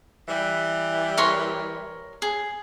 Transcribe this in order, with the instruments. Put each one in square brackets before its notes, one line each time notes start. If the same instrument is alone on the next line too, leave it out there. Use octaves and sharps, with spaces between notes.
[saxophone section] E3 G3
[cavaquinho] A#4 C#5 C6
G#4